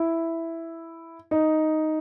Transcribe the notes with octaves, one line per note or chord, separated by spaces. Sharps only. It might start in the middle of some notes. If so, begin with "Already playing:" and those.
Already playing: E4
D#4